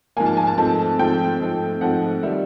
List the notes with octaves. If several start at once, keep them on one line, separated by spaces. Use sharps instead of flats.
G#2 F3 A#3 G#5
A5
G#5
A5
G#2 F3 A3 C4 A5
G#2 F3 A3 C4 G5
G#2 F3 A3 C4
G#2 F3 A3 C4 F#5
D#3 G3 E5